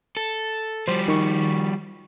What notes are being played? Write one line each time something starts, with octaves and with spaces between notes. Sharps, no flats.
A4
F3 G3 C5
D#3 C#6